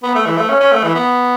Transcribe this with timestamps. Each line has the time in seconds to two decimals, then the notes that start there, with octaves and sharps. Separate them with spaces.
0.03 B3
0.15 A3
0.26 E3
0.37 A3
0.49 C#4
0.60 C#4
0.72 A3
0.83 E3
0.95 B3